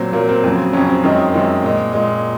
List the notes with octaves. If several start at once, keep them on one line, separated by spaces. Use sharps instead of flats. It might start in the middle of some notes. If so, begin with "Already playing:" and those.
Already playing: A#2 F#3 C4
A#2 F#3 A#3
C4
F2 C#3 F#3
F2 C#3 F#3 C#4
C4
F#2 D#3 G#3
F#2 D#3 G#3 C4
A#2 G#3
A#2 G#3